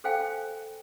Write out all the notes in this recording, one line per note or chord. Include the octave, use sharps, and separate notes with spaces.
A4 C5 F5 G5 G#5